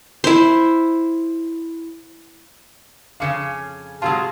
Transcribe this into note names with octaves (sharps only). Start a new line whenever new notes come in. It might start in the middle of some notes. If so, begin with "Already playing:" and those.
E4 C5
F2 C#3 C#4 F5 D6 C#7
G#2 C3 F#3 G#3 F4 A5 E6